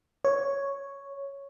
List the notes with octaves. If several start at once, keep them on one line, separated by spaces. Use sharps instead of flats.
C#5